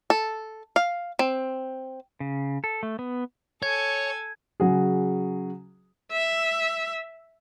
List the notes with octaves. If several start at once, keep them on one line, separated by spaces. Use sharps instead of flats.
A4
F5
C4
C#3
A4
A3
B3
A4 C#5 G#5 G#6
C#3 F#3 F#4 G#4
E5